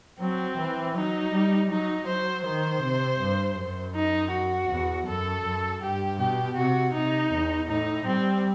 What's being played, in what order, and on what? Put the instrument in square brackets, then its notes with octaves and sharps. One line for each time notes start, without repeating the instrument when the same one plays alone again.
[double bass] F#3 [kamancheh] C4
[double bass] E3
[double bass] F#3 [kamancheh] D#4
[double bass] G3
[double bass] F#3 [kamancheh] D#4
[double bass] F#3 [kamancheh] C5
[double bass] D#3 [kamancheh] C5
[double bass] C3
G2
F#2
[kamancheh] D#4
F#4
[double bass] E2
[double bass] F#2 [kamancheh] A4
[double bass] F#2
[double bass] G2 [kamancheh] G4
[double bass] B2 [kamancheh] G4
[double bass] C3 [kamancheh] F#4
[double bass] C3 [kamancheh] D#4
[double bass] E2
[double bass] A2 [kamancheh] D#4
[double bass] G3 [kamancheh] C4